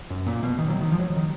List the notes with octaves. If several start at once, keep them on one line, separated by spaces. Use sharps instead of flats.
F#2
A#2
B2
D#3
F#3
D#3
F3
F#3
D#3